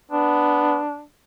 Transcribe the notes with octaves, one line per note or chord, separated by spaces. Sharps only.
B3 D4